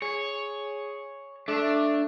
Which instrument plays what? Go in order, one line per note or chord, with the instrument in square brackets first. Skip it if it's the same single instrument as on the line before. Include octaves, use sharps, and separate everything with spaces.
[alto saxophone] G#4 [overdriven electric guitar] C#5
[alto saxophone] A3 [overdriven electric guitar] D4